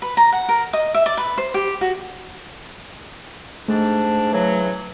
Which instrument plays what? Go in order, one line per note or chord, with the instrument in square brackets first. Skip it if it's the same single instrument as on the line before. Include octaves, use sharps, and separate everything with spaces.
[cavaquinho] B4
A#5
F#5
A#4
D#5
E5
D5
B4
C5
G4
F#4
[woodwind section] G#2 D4 [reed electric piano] A3
[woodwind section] C#3 E3 F#3